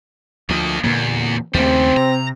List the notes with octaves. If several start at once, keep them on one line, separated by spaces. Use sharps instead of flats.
D2 F3 A#3 D#5
E2 A#2 D3 A#3
D#2 C#3 G3 A3 C4
C3 A#5